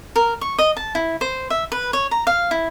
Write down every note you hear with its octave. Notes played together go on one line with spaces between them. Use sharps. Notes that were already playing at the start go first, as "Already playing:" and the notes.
A#4
C#6
D#5
A5
E4
C5
E5
B4
C#5
A#5
F5
E4